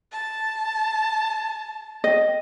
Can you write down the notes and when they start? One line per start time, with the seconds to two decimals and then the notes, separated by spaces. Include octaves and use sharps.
0.12 A5
2.04 D#5